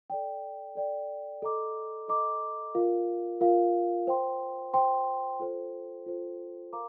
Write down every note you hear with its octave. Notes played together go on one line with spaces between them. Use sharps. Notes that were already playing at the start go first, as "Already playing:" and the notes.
A4 D5 G5
A4 D5 G5
A4 D#5 A#5 D6
A4 D#5 A#5 D6
F4 A#4 F5
F4 A#4 F5
C5 G5 C6
C5 G5 C6
F4 A4 C5
F4 A4 C5
A#4 F5 A#5 D6